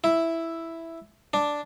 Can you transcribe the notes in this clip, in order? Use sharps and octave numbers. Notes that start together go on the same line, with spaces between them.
E4
D4